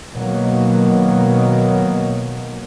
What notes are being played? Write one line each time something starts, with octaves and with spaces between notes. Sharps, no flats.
B2 D#3 F#3 A#3